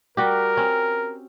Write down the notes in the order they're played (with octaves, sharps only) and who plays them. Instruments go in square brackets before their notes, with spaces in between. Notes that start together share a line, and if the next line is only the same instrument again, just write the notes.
[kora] G3 F#4 G4 [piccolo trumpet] A#4
[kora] C4 C#4